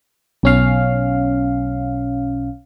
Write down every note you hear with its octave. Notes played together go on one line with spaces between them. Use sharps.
B1 C#4 F5